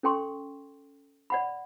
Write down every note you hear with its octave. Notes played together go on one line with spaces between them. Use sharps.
C#4 A4 G5 C6 C#6
D5 F#5 B5